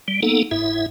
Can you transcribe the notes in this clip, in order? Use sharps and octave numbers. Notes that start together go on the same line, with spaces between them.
G3
A#3 B3 D#4 A4
F#1 G#2 E4 E5